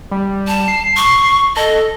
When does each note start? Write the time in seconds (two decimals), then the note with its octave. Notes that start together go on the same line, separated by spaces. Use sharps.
0.11 G3
0.47 A5
0.68 C7
0.97 C#6
1.57 A4 D#5